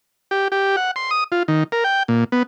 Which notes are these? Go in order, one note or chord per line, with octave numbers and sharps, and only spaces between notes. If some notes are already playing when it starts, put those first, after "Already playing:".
G4
G4
F#5
C6
D#6
F4
D#3
A#4
G5
A#2
B3